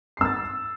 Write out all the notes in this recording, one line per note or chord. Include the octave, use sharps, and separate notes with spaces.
E6 A6 C7